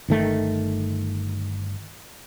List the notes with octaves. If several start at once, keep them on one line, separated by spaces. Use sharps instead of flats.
G1 D#3 A3